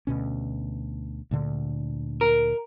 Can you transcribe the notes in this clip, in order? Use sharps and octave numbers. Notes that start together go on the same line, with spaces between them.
D2 B2 C#4
D2 A#2 D3
A#4